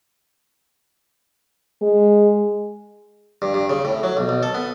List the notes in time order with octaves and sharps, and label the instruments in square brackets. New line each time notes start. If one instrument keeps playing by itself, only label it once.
[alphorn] G#3
[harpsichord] G2
G2
C#3
A2
F#3
B1
B1
A4
B3